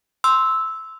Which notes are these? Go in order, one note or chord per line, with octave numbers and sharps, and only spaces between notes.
C6 E6